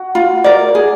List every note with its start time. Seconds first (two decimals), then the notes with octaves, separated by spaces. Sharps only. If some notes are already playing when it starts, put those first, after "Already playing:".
Already playing: F#4 F#5
0.15 F4
0.44 A#4 D5
0.75 G#4